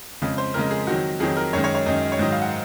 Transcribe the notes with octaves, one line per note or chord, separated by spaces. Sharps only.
F2 C#3 G#3
C5
F2 C#3 G#3 A#4
G#4
F2 D#3 F#3 F#4
F2 D#3 F#3 G#4
A#4
F#2 D#3 G#3 C#5
C#5
C#5
F#2 D#3 G#3 D#5
C#5
G#2 D#3 F#3 D#5
F5
F#5